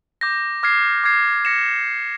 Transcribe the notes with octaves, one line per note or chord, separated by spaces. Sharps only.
D6 G6 A#6
D6 F6 G#6 C7
D6 F6 G#6 C7
A#6 C#7 E7